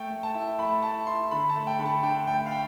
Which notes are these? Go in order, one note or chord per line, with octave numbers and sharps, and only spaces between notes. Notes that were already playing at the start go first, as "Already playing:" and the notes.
Already playing: A3 G5
A3
A5
E4
A3 B5
E4 A5
E4 C6
D3 B5
A5
A3
G5
D3 B5
A5
D4 G5
A3 G5
F5
G5